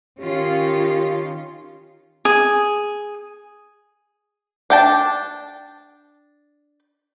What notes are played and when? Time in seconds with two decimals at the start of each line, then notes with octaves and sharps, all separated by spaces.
0.20 D#3 C#4 F4 G4
2.25 G#4
4.70 D4 G5 A5